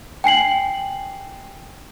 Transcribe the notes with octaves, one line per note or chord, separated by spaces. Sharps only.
G5 G#5 C7 F#7